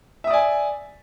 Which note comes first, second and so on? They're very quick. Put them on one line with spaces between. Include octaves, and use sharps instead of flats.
E5 D#6 D5 G#5